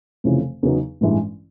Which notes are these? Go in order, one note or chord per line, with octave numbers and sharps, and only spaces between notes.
F1 F2 C#3 E3
E2 C#3 F#3 B3 D#4
A1 G2 E3 G#3